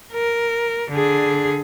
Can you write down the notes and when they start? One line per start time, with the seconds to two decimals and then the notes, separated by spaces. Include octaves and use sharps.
0.13 A#4
0.91 D3 G#4